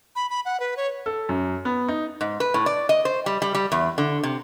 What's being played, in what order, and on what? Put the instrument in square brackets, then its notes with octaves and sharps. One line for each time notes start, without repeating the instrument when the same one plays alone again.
[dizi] B5
B5
F#5
B4
C#5
[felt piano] A4
F#2
B3
D#4
[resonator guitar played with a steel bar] G#2
B4
A2
D5
D#5
C5
G3
G3
G3
E2
D3
C3